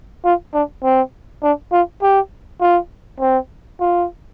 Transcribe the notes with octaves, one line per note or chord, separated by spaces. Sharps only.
F4
D4
C4
D4
F4
G4
F4
C4
F4